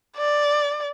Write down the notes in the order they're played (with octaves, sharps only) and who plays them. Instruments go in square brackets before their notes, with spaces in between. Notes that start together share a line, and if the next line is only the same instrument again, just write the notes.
[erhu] D5